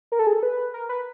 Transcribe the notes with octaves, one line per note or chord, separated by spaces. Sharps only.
A#4
A4
G#4
A4
B4
A#4
B4